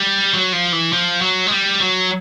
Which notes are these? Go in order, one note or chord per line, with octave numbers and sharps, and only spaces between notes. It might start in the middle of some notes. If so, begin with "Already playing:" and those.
Already playing: G3
F#3
F3
E3
F3
F#3
G#3
G3
F#3